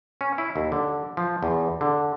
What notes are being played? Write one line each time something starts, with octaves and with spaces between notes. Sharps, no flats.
C#4
E4
D#2
D3
F3
E2
D3